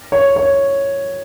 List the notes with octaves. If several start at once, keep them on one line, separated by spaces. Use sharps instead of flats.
C#5
C#5